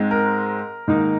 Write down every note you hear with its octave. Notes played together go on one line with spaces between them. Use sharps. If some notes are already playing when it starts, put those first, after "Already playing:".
Already playing: G#2 G#3 C4
A#4
G#2 D#3 A#3 D#4